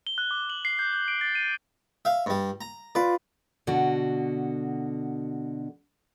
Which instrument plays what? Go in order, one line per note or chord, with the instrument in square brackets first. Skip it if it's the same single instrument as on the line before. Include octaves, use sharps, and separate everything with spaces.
[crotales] G7
F#6
D6
F#7
C7
G6
G6
D7
A6
D#7
[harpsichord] E5 F5
G2 G3
A#5
[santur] F4 B4 [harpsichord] D5
[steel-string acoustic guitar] B2 D3 F#4